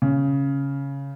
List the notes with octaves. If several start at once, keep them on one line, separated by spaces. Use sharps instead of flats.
C#3